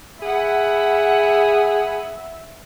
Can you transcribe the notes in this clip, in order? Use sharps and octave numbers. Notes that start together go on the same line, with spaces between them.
G#4 E5 F#5 B5